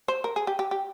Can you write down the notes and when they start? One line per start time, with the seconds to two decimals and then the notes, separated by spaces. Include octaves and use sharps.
0.08 C5
0.24 A#4
0.36 G#4
0.47 G4
0.59 G4
0.71 G4